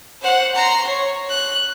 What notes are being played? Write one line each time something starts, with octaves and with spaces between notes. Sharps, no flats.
C5 F#5
A#5 C6
C#5
F#6